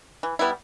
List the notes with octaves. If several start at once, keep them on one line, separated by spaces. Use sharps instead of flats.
E3
G3 B3 E4